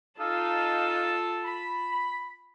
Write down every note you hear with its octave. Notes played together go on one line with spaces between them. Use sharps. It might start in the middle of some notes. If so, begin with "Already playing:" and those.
D#4 F4 A4 F5 A5
B5